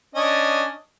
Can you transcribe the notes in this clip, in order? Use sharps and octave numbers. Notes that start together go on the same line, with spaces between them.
C#4 D4 D#5